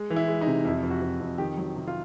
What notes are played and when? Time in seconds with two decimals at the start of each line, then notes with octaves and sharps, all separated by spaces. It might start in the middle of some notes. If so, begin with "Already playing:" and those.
Already playing: G#3
0.10 E3
0.16 E4
0.28 G#3
0.41 D#4
0.47 C3
0.65 F2 E4
0.83 F2
0.90 F#4
1.01 F2
1.20 F2
1.38 D#3 G4
1.57 F#3
1.76 C3
1.87 F4